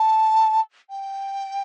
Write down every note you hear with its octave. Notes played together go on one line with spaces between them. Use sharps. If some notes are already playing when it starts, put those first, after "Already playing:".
Already playing: A5
G5